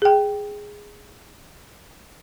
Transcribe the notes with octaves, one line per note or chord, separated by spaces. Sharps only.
G#4 G5